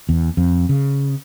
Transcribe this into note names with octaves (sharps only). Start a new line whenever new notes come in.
E2
F2
C#3